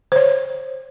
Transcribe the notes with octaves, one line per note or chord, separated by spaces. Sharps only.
C5 C#5